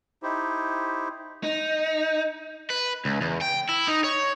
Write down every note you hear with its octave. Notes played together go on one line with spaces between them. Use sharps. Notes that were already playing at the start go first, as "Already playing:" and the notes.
D#4 E4 G4 C5
D#4
B4
C#2
E2
G5
E4
D#4
C#5